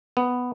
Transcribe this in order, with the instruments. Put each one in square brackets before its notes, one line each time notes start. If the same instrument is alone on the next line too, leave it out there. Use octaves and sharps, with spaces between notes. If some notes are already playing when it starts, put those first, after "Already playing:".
[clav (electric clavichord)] B3